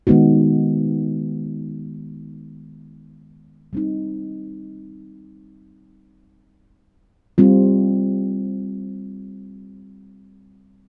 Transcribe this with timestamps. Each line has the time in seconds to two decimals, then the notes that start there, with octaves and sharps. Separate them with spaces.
0.07 D#3 G#3 B3 D#4 F#4
3.73 G3 C4 D#4
7.38 G3 C4 F4